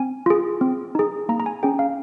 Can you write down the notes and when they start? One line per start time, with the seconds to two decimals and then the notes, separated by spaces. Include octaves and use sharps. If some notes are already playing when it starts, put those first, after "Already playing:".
Already playing: C4 G#5
0.26 F4 G#4
0.61 C4
0.95 D#4 G#4
1.29 A#3 A#5
1.40 A#5
1.46 G#5
1.63 C#4 G#4 G5
1.79 F5